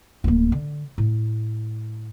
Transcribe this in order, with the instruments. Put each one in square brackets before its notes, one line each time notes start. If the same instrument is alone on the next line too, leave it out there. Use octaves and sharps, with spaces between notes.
[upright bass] D1 A#3
D3
A2